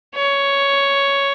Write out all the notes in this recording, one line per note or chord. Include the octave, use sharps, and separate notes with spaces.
C#5